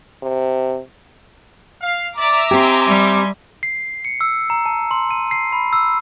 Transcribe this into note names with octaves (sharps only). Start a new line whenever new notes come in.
C3
F5
D5 E5 A#5 D6
C4 D#4 G4 G#5 C6
G3
C7
C#7
E6
A#5
A5
C6
D#7
C7
B5
E6